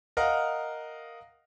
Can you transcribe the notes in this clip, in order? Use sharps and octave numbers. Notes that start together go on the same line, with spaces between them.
A#4 D#5 F5 F#5 A#5